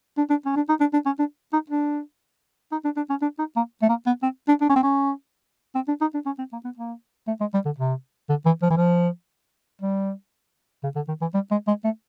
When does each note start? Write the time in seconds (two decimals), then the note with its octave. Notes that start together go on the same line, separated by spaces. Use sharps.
0.18 D4
0.30 D4
0.46 C#4
0.56 D4
0.69 D#4
0.81 D4
0.93 D4
1.06 C#4
1.19 D4
1.53 D#4
1.70 D4
2.72 D#4
2.85 D4
2.97 D4
3.10 C#4
3.22 D4
3.39 D#4
3.56 A#3
3.82 A3
3.89 A#3
4.07 B3
4.23 C4
4.48 D4
4.61 D4
4.70 C#4
4.76 C4
4.83 C#4
5.75 C4
5.88 D4
6.01 D#4
6.14 D4
6.26 C#4
6.39 C4
6.52 A#3
6.65 B3
6.77 A#3
7.28 A3
7.41 G#3
7.54 G3
7.65 D3
7.78 C3
8.30 D3
8.46 E3
8.63 F3
8.70 E3
8.77 F3
9.82 G3
10.84 C#3
10.96 D3
11.08 D#3
11.22 E3
11.34 G3
11.51 G#3
11.68 G#3
11.84 A3